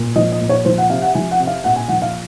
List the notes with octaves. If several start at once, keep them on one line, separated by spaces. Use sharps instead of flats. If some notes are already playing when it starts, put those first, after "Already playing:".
Already playing: A#2
F3 D#5
D#5
A#2
C#5
F3 C5
F#5
C3 F5
F#5
F3 G#5
F#5
C3
F5
A#2 F#5
G#5
F3 F#5
F5